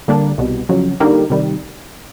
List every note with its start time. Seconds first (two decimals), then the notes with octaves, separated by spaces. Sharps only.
0.08 D3 G3 A#3 D4
0.38 C2 B2 G3
0.69 F2 C#3 F#3
1.00 D3 G3 A#3 D#4 G4
1.30 C3 D#3 G3